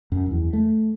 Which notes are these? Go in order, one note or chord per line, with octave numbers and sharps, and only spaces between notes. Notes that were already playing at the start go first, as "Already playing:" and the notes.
F#2
E2
A3